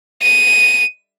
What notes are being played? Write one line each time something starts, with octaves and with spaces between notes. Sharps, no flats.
D#7